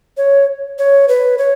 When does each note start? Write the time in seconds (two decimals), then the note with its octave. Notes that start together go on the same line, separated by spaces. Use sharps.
0.17 C#5
0.78 C#5
1.08 B4
1.38 C#5